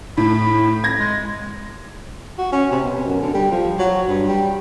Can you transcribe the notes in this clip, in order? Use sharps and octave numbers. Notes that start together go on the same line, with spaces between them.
A2 B5
G#6 A#6
G#3
F#4
C#4
C3
B2
F#2
D3
G3
F3
F#3
G2
G3